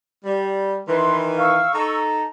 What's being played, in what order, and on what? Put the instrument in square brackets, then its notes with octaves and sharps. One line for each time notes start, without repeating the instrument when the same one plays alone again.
[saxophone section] G3
[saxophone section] D#3 E3 [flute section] B4 C6
[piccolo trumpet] F5 [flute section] C#6 E6
[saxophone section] D#4 A4 [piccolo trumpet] A#5